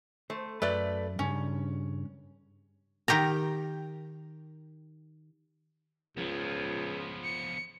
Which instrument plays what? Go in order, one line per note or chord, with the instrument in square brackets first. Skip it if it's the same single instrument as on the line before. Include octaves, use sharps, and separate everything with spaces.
[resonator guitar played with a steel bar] A3 [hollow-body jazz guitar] C5
[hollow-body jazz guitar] F#2 [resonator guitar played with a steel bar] A3 B4 D5
[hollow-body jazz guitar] G2 C#3 [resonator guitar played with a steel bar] C#4
[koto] D#3 G4 A#4 A#5
[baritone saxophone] C#2 [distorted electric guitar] F3 B3
[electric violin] C#7